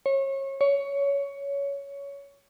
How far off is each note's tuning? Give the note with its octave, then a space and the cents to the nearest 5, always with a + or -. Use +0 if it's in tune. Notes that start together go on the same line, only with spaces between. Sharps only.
C#5 -30
C#5 +15